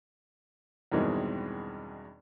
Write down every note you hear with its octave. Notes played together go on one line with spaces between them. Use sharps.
E2 G2 B2 D#3 G#3 C4